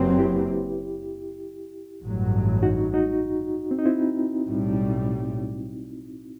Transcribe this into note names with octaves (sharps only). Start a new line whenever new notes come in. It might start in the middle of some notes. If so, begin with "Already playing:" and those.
Already playing: F#1 F#2 F#3 C4 G4 B4
E4 G4
A1 G2 F#3
D#4 F#4
D#4 F#4
C4
D#4
C4 E4
B1 A2 G3